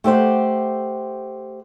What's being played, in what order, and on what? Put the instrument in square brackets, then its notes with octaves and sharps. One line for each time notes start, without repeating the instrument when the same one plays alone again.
[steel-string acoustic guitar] A3 G4 C5 F#5